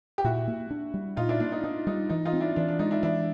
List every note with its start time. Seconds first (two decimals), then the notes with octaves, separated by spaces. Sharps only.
0.18 G4
0.24 A#2 E4 F#4
0.48 A#3
0.71 D4
0.94 G3
1.17 A#2 D#4 F4
1.29 D4 E4
1.40 A#3 D4 E4
1.52 D#4
1.64 D4 D#4
1.87 G3 D#4
2.09 E3 D#4
2.25 D#4 F4
2.33 C4
2.40 D4 E4
2.56 E3 D4
2.69 D4
2.79 G#3 D#4
2.91 D4 E4
3.03 E3 D4 E4